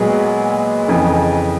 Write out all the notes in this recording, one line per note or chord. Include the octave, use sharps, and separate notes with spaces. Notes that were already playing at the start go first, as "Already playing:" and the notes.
Already playing: A#2 F#3 G#3 B3 G#4
F2 C#3 E3